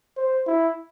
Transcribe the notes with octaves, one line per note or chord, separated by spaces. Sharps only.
C5
E4